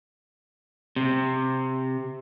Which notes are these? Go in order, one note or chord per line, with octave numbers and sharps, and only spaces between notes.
C3